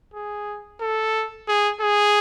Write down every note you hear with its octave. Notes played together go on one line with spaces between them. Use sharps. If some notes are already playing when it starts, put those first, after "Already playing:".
G#4
A4
G#4
G#4